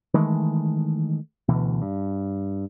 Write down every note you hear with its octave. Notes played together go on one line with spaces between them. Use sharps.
D#3 E3 G#3 A3
D2 B2 E3
G2